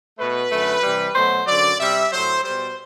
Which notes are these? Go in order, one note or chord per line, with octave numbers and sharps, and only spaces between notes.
B2 A3 B4
F#2 D3 A3
C3 E3 G3
B2 F#3 A3 C5
F#2 D3 F#3 D5
C3 G3 E5
A2 F#3 A3 C5
G3 C5
B2